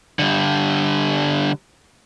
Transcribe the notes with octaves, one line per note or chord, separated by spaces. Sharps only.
D3 G3